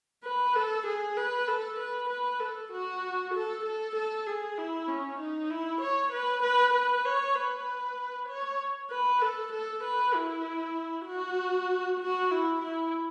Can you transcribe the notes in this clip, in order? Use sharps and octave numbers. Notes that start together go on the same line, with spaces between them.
B4
A4
G#4
B4
A4
B4
B4
A4
F#4
A4
A4
A4
G#4
E4
C#4
D#4
E4
C#5
B4
B4
B4
C#5
B4
C#5
B4
A4
A4
B4
E4
F#4
F#4
E4
E4